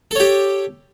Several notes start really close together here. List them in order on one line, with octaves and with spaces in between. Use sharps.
A4 C#5 G4